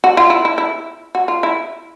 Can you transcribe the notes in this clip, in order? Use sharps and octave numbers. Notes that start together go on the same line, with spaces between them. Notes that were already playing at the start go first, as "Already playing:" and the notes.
F#4
F4
E4
E4
E4
F#4
F4
E4